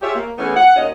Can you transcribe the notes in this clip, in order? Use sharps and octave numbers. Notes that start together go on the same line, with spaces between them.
F4 G4 G#4 C#5 E5
A#3
E3 A3 B3 C#4 G#4 B4
F#5
D#2 C#4 F4 D#5